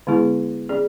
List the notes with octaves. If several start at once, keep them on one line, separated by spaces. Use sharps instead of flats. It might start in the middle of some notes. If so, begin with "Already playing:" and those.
D3 G#3 B3 E4 G#4
C#4 G#4 D5